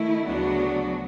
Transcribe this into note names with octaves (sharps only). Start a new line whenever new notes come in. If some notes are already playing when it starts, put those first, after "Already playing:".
Already playing: D#3 A3 E4
D2 C#3 F#3 B3 D4 F#4